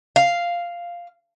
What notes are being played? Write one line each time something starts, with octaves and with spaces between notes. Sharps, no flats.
F5